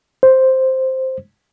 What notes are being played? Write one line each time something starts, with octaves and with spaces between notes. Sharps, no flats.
C5